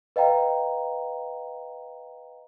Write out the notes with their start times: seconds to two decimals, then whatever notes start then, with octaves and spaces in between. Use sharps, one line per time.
0.16 B4 D#5 F5 G5 A#5